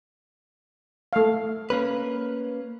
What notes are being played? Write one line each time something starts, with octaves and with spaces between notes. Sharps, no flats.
A3 F5
A#3 C#4 B4